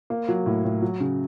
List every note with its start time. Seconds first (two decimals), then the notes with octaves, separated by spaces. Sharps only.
0.10 A#3
0.29 F#3
0.46 A2
0.64 A2
0.82 F#3
1.00 C#3